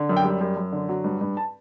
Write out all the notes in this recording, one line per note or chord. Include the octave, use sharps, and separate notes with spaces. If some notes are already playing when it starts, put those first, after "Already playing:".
Already playing: D3
F#2
G5
G3
F#2
F#2
D3
F#3
G2
G2
A5